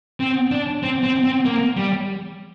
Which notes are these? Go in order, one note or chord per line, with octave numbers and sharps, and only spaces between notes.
C4
D4
C4
C4
C4
A#3
G3